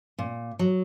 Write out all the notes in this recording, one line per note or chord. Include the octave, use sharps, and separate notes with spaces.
A#2
F#3